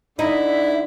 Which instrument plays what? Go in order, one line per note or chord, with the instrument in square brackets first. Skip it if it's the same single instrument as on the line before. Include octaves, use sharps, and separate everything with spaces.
[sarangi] D3 [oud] D#4 [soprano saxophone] E4 [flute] E5